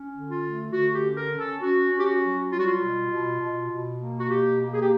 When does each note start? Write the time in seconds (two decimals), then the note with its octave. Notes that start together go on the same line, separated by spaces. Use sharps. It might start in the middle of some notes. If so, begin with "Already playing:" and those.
Already playing: C#4
0.13 D3
0.27 F4
0.42 A3
0.72 D3 F#4
0.93 G4
1.01 C#4
1.16 A#4
1.30 C#4
1.38 A4
1.61 C#4 F#4
1.91 C#4
1.98 G4
2.05 F#4
2.21 F#3
2.50 G3 F4
2.58 F#4
2.66 F4
2.80 B2
3.10 B2
3.39 B2
3.69 B2
3.99 A#3
4.18 F#4
4.28 B2 G4
4.59 A#3
4.73 G#4
4.80 G4